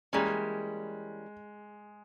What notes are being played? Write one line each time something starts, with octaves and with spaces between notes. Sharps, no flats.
E3 G3 G#3 A#3 C#4